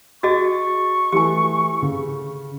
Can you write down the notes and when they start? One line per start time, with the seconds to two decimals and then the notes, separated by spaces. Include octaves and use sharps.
0.23 F#4 G#4 D#5 C#6 A6
1.12 E3 A3 G4 G#5
1.82 C#3